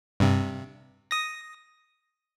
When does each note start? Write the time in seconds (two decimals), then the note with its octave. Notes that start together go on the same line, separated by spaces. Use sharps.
0.20 G2 C3
1.11 D#6 A#6